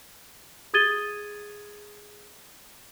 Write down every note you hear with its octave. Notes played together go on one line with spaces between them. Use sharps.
G#4 D#6 G#6 A6 D#7 G7